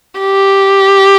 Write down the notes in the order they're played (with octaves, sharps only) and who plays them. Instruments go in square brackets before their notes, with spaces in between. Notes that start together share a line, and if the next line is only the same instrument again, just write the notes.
[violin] G4